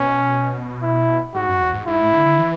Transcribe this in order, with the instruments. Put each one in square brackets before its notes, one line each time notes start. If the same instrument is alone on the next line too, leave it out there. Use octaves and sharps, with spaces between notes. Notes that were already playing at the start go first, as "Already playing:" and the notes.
Already playing: [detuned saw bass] B2 [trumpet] C#4
[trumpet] E4
[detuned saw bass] G#2 [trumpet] F#4
[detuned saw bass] F#2
E2
G#2
[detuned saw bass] G#2 [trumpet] E4
[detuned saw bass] A2
D3
D3
E3